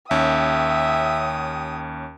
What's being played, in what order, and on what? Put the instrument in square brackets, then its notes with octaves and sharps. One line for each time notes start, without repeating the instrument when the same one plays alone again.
[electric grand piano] D#2 C#4 [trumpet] E5 [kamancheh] G5 D#6